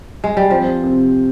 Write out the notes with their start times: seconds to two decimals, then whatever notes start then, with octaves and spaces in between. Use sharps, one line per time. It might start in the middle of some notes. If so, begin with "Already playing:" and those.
0.24 G#3
0.37 G3
0.50 F3 C4
0.84 C3